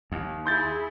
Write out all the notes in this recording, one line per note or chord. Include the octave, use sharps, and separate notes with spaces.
D#2
E4 G#4 C6 G6 A6